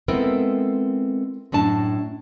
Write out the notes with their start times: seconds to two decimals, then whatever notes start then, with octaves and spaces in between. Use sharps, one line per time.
0.08 G#3 B3 C4 E4 A4 A#4
1.52 F#2 A2 D4 A5